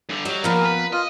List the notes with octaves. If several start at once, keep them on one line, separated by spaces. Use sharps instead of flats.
G2 D3
F#3 G3 D#5
A#2 F3 B3 A#4
B4
F4 D#5